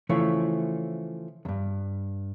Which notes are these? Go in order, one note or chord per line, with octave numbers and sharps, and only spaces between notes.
C#3 E3 F3 A3 E4 C#5
E2 G2